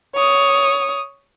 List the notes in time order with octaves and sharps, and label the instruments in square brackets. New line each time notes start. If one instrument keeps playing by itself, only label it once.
[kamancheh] C#5 D#6